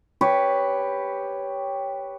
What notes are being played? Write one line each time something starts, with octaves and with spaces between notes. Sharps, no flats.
G4 B4 C#5